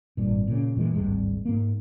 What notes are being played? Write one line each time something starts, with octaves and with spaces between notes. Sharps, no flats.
G#1 G2 A#2
A#2 C#3
F#1 A#2 E3 G#3
D1 G#1 G2 G#3
G#2 A#3